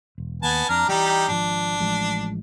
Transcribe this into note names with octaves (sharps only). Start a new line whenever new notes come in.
E1
D#2 B3 G#5 A5
F2 D4 A#5 F6
E3 F#3 G3 D#4 G4
G#1 F3 D4
A1 F3 G#3